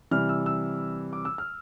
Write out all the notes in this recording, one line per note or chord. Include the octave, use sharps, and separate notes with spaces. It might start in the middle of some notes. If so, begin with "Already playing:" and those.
C3 E3 G3 F6
E6
E6
D6
E6
F6